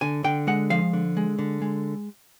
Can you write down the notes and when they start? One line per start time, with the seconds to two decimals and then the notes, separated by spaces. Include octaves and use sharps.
0.01 D3 G#5
0.24 D3 G5
0.47 G#3 F#5
0.70 F3 F5
0.93 D3
1.17 G#3
1.39 D3
1.61 G#3